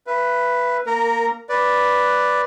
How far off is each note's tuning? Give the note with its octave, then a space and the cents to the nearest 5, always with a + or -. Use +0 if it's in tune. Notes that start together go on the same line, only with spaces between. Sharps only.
B4 +0 E5 +35
A#3 +0 A#4 -20 A#5 +0
B4 +0 D5 +0